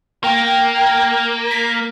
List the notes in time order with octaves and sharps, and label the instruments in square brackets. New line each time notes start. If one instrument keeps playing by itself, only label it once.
[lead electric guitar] A#3 [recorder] G5
[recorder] B6